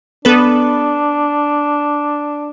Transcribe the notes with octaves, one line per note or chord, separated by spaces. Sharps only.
B3 D4 A4 B4